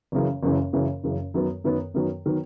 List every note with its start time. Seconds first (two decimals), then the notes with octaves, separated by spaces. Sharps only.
0.12 F#1 F#2 C#3 E3
0.43 F#1 F#2 C#3 E3
0.73 F#1 F#2 C#3 E3
1.04 F#1 F#2 C#3 E3
1.34 F#2 D#3 F#3 B3
1.64 F#2 D#3 F#3 B3
1.94 F#2 D#3 F#3 B3
2.26 D#3 F#3 B3